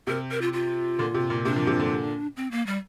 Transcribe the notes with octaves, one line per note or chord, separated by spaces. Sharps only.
C3 A#4
A#4
F4
F4
A#2 D3
C3
A#2
C3 D4
F3 A#3
C3 F3
A#2 D3
C4
A#3
G3